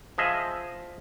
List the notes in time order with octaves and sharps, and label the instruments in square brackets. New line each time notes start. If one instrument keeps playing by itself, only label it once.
[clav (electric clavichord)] F3 G#4 D#5 E5